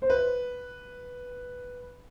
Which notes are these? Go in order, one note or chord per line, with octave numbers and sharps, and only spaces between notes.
C5
B4